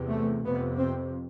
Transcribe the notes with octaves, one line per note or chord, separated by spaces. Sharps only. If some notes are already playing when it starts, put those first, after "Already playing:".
Already playing: E2 C3
A3
F2 C3 B3
C4